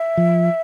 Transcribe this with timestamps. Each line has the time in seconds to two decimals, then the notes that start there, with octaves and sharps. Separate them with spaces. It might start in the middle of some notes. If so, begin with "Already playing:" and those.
Already playing: E5
0.17 F3